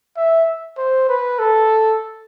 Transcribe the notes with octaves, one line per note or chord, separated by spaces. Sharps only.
E5
C5
B4
A4